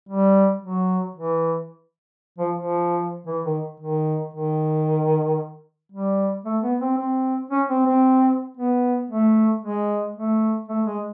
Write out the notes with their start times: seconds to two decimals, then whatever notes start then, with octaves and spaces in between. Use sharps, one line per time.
0.09 G3
0.62 F#3
1.15 E3
2.38 F3
2.56 F3
3.27 E3
3.45 D#3
3.80 D#3
4.34 D#3
5.92 G3
6.45 A3
6.63 B3
6.80 C4
6.97 C4
7.51 C#4
7.69 C4
7.86 C4
8.57 B3
9.10 A3
9.63 G#3
10.16 A3
10.68 A3
10.86 G#3